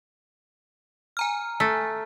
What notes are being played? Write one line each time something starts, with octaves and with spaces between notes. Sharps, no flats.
G#5 A#5 F6
A3